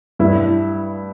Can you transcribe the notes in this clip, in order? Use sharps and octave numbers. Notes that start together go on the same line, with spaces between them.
G2 E4